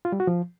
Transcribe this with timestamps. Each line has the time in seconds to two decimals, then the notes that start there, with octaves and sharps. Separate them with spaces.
0.05 F4
0.12 G3
0.20 F#4
0.27 F3